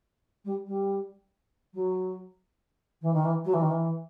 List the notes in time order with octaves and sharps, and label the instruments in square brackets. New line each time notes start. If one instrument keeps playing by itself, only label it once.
[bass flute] G3
G3
F#3
E3
D#3
E3
F#3
E3
D#3
E3